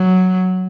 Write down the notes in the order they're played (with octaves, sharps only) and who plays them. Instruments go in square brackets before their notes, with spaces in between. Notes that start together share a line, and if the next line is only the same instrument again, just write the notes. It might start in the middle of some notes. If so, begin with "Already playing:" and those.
Already playing: [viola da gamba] F#3